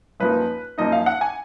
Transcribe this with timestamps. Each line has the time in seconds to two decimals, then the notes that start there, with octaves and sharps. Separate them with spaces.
0.20 F#2 F3 A#3 D#4 B4
0.78 F#2 F3 A#3 D#4 D#5
0.92 F5
1.06 F#5
1.21 G#5